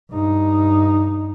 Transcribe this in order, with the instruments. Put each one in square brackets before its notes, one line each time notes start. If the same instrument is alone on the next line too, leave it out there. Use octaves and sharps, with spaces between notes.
[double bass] G2 D#4